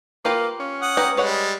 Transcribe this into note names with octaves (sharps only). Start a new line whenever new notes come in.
A#3 F4 G4 B4
C#4
F#5 D#6
G4 B4 A#5
G3 G#3 B4 C#5 F#5